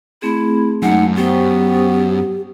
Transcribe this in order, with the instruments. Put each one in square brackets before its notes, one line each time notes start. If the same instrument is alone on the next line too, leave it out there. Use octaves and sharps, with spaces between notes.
[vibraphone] A3 C4 G#4 [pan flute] E4
[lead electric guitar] F#2 [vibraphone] G#3 A3 [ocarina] D#4 [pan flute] F#5
[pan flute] B3 [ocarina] G4 [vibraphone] C5 G5 C#6